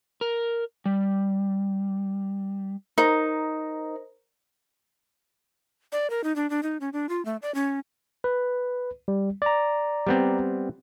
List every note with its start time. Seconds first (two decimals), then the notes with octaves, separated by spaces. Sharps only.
0.21 A#4
0.86 G3
2.98 D#4 A#4 C5 A#5
5.92 D5
6.10 A#4
6.24 D#4
6.36 D4
6.50 D4
6.63 D#4
6.81 C#4
6.93 D4
7.09 F4
7.25 A3
7.42 D5
7.55 C#4
8.24 B4
9.08 G3
9.42 D5 A#5
10.07 G3 B3 C4